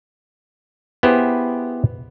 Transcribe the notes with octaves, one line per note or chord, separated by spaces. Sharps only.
B3 E4 G4 G#4 C5